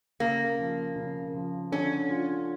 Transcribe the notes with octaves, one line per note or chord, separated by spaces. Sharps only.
C#3 A#3
F3
C#3
F3
D3 C#4
F4